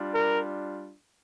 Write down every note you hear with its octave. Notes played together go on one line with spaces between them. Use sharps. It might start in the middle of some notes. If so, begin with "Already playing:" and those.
Already playing: G3 D4 F4
A#4